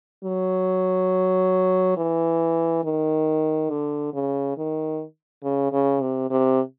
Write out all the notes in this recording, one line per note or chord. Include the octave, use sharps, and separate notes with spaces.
F#3
E3
D#3
D3
C#3
D#3
C#3
C#3
C3
C3